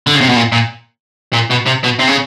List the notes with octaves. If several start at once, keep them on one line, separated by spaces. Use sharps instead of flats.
D3
C#3
C3
B2
A#2
A#2
A#2
B2
C3
B2
C3
C#3